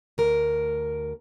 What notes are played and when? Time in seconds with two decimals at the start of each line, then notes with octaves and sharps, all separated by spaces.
0.18 D2 A#4